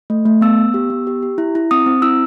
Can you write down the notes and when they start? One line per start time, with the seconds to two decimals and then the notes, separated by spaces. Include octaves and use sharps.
0.10 A3
0.25 A3
0.41 B3 E6
0.58 B3
0.74 G4
0.90 B3
1.07 G4
1.22 G4
1.38 E4
1.55 E4
1.71 C4 D#6
1.86 C4
2.02 E4 E6